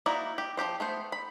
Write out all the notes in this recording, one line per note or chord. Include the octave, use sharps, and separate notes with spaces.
A#3 D#4 E4 F#4 D5
G4
F3 C4 G4 C5
A3 B3 C5
B5